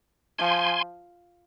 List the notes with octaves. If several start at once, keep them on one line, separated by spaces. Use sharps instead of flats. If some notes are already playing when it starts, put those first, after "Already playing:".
F3 G#5 C6